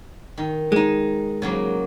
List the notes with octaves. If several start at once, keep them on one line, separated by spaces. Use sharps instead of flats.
D#3
G#3 D#4
C#3 F#3 A#3